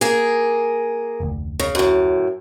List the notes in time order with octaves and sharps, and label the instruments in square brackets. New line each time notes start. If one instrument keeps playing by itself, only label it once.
[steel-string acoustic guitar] A#3 G#4
[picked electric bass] F1 D2
[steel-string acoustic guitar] C#3
F#2 A2